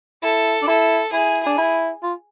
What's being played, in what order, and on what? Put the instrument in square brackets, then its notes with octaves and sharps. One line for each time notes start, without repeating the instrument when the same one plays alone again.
[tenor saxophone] E4 [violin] A4
[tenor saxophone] D4
[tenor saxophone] E4 [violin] A4
[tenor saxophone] E4 [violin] G#4
[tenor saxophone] D4 [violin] G#4
[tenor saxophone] E4
F4